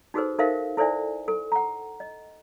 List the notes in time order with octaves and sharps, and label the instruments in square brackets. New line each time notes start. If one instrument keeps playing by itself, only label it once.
[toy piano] D#4 F#4 G#4 A4 B4 C5
D#4 A4 A#4 C5 E5 F5
E4 A4 C5 D5 E5 G#5
A4
F#5 A#5
D#5